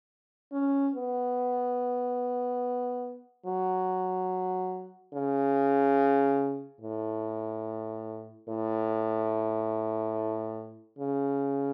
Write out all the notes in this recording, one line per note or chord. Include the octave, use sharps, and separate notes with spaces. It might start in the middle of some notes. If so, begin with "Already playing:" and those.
C#4
B3
F#3
C#3
A2
A2
C#3